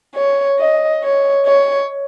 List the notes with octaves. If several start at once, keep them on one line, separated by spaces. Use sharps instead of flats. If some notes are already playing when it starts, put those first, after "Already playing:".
C#5
D#5
C#5
C#5